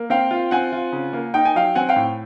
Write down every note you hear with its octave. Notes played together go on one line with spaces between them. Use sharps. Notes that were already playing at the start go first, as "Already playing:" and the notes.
Already playing: A#3
C4 F5 G5
F4
C4 F#5 G#5
F4
C#3
A#3
D#4 G5
G#5
F#3 F5 G5
C4 F#5 G#5
F5 G5
A2